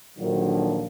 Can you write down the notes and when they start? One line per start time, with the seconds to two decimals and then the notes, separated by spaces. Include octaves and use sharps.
0.18 A#1 D3 D#3 F3 F#3